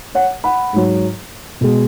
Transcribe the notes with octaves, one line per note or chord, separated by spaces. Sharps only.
C#5 F#5
F#5 B5
G#2 F#3
B2 G#3